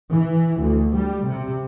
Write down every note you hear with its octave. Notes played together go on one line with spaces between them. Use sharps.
E3
D2
G3
C3